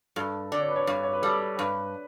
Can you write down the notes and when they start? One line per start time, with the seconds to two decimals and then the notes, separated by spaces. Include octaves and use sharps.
0.16 G2 A4
0.52 D3 D5
0.60 C#5
0.68 B4
0.76 C#5
0.87 G2
1.03 C#5
1.13 B4
1.22 G3 A4
1.58 G2 B4